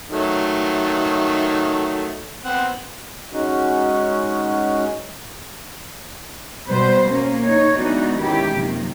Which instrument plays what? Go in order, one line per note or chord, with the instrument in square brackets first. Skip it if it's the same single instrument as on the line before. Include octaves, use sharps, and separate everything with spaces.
[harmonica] D#3 F#3 A3
B3 C4 F#5
[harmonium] G#3 C#4 D#4 F#4
[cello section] B2 G3 B4 C5
A#3 C#4
D#4 C#5
E3 G#3 B3 D4 D#4 F#4
D#3 C#4 E4 G4
F#2 C3 D#3 F3 A#3